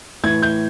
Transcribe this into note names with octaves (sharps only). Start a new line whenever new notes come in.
A2 E3 G#6
G6